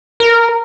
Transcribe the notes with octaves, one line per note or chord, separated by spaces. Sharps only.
A#4